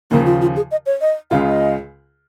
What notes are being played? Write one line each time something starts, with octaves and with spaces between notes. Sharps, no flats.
D#2 C#3 F3 A#3
F4
F4
G#4
D#5
C#5
D#5
C#2 C#3 G#3 F4 F5
D#5